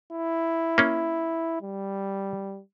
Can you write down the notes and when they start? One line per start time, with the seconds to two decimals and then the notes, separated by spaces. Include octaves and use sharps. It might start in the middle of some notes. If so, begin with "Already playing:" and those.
0.12 E4
0.78 A#3 C#4
1.62 G3